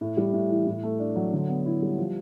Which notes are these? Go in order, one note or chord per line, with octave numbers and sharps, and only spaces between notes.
A2
G3
A2
E3
A2
A3
D4
F#3
D3
B3
E4
G3
F3